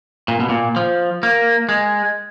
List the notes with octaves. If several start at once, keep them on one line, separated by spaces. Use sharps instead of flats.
A#2
B2
A#2
F3
A#3
G#3